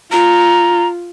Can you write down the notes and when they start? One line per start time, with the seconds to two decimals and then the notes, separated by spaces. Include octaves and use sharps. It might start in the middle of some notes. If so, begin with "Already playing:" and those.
0.12 F4 A#5